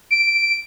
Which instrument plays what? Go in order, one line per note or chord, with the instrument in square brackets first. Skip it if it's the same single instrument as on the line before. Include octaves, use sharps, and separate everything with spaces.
[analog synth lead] D7